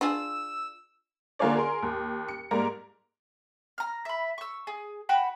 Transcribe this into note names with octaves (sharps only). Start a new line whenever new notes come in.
D4 F4 G#4 E6
D3 A#3 F4 G#4 C#5 D5
G#4 A#4 C6
D#2
C#7
G#2 G3 A#3 A#4 A#5
A#5 F6
E5 B5
C#6 E6
G#4
F#4 G5 B5